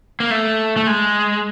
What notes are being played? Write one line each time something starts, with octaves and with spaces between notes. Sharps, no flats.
A#3
A3
A3
G#3